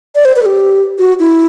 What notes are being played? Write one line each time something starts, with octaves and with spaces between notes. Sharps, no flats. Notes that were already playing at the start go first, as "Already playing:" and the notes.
D5
C5
B4
A4
G4
F#4
E4